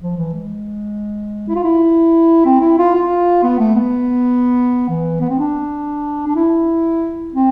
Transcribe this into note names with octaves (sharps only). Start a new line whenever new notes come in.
F3
E3
G#3
E4
F4
E4
C4
E4
F4
F4
B3
A3
B3
E3
B3
C4
D4
D4
E4
C4